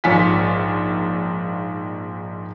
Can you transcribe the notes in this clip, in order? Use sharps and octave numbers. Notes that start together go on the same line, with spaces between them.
A#1 G#2 F4 C#5 G#5 B6